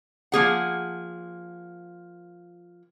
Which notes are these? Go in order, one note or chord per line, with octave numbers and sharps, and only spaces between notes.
F3 A#3 G#4 F#5